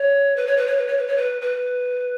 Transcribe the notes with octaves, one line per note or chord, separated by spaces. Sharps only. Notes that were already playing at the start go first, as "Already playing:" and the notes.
Already playing: C#5
B4
C#5
B4
C#5
B4
C#5
B4
C#5
B4
B4